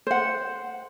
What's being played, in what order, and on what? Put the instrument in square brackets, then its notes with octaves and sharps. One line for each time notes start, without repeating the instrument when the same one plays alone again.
[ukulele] C5 F#5